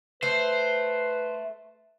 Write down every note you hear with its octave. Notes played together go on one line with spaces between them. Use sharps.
A3 B4 C5